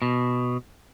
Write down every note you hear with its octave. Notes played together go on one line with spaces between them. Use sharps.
B2